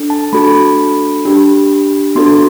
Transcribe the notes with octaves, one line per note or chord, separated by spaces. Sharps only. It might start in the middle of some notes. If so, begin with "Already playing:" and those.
Already playing: D4 A4
A5
A3 D4 F#4 A4 B5
D4 G4
B3 D4 F#4 A4 C6